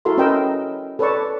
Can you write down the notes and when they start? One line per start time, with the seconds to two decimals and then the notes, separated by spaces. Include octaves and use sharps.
0.05 E4 F#4 A4 A#4 E5 C6
0.17 C#4 A#4 B4 D#5 G5 E6
0.99 A4 B4 C#5 D5 A5 C#6